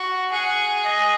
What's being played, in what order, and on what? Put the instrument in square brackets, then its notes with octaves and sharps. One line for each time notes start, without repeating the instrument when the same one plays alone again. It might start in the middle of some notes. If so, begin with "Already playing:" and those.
Already playing: [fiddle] F#4
[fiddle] G#4 [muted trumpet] F#5
[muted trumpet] D#5